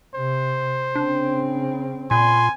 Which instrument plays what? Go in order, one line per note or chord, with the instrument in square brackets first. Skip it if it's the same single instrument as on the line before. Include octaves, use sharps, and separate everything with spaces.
[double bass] C3 [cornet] C5
[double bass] C#3 C4 [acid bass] D4
[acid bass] A#2 [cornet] G#5 [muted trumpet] C6